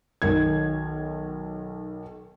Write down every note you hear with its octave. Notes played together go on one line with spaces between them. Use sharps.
B1 D#3 G#6